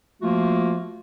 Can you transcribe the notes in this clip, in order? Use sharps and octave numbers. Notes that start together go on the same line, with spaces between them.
F3 A3 A#3 F4 F#4